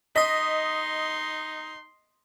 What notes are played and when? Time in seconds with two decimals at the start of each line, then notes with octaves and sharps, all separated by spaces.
0.16 D#4 D#5 C6 D#6 A#6 B6